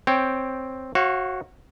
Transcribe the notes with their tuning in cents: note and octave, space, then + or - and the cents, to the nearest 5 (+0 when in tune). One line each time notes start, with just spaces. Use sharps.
C4 +0 C#5 +0 G5 +0
F#4 +0 C#5 -35 F5 -15